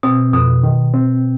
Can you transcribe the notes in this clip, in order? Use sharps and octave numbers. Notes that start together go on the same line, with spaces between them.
B2 C4
F2 B2
D#3
C4